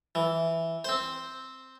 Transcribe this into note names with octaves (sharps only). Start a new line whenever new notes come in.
E3
C4 C5